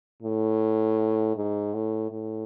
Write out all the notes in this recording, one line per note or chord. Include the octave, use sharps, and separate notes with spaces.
A2
G#2
A2
A2